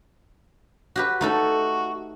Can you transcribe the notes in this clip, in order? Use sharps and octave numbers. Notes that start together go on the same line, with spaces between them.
F#4 G4 B4
A3 D#4 F#4 A4